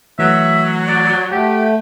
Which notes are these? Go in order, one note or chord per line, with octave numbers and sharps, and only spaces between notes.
E3 F#3 A3 E5
D5
A3 G4 F#5